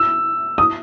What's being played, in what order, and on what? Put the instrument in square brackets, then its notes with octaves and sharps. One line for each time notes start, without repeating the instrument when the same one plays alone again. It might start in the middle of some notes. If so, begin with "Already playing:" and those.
Already playing: [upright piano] E6
D#6